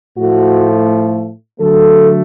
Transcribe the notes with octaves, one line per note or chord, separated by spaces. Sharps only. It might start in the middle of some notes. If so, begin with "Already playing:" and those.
A2 F3 A3 F#4
D3 F#3 A3 A4